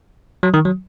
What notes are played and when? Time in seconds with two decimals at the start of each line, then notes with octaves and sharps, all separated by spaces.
0.43 F#3
0.54 D#3
0.65 F#3